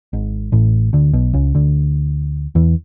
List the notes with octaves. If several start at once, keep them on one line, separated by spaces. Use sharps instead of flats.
G#1 G#2
A1 A2
D2 D3
B1 B2
C#2 C#3
D2 D3
E2 E3